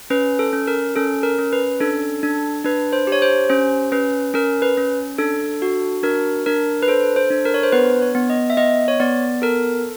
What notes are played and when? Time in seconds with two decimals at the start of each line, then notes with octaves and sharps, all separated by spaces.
0.10 C#4 B4
0.39 A4
0.53 C#4
0.67 A#4
0.96 C#4 A4
1.23 A#4
1.39 C#4
1.53 B4
1.80 D4 A4
2.23 D4
2.64 D4 B4
2.93 C5
3.07 G4
3.12 C#5
3.22 C5
3.50 C#4 C5
3.92 C#4 B4
4.34 C#4 A#4
4.62 B4
4.77 C#4
5.18 D4 A4
5.62 F#4
6.03 D4 A#4
6.46 D4 A#4
6.83 B4
6.88 A4 C5
7.16 C5
7.30 D4
7.45 A#4
7.54 C#5
7.63 C5
7.72 B3 B4
8.02 C#5
8.15 B3
8.30 D#5
8.50 E5
8.57 B3 D#5
8.88 C#5
9.00 B3 D5
9.42 A4 A#4